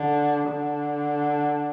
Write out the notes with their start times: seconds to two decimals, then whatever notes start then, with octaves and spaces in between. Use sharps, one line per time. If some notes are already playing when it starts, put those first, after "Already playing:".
Already playing: D3
0.49 D3